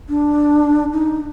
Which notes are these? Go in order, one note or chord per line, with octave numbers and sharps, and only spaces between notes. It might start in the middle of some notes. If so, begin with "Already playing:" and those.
D4
D#4